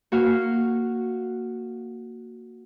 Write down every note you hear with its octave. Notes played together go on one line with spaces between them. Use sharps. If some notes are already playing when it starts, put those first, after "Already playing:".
A#3 F#4 F5